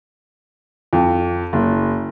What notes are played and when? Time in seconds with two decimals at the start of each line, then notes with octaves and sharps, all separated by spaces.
0.93 F2
1.53 F#1